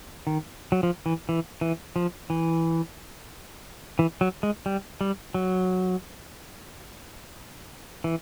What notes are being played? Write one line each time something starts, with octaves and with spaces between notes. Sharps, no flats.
D#3
F#3
F3
E3
E3
E3
F3
E3
E3
F#3
G#3
G3
G3
F#3
E3